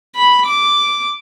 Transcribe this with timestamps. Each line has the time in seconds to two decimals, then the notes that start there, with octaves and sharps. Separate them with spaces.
0.16 B5
0.46 D6